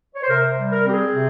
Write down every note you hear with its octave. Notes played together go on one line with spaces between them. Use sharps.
C#5
C5
C3 A#4
C5
G3
A#4
C4 G4
G#4
C3